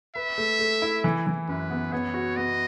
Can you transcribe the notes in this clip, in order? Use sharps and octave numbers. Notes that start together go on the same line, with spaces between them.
B4 E5
A3
A3
E4
E3
E3
F#2 B4
B3
B3 C#5
F#4
B3 D#5